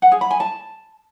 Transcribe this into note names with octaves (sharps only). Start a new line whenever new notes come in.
F#5
G#4
B5
G#5
A5